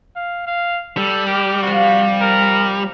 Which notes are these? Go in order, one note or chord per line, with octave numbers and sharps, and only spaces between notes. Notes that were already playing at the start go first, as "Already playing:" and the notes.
F5
F5
G3 A4
G4 A#4
C3 F3 F#4
A#4